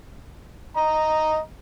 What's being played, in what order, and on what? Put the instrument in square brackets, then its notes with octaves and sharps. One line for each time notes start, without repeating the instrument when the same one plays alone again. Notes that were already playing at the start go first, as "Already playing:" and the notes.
[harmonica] D#5 A#5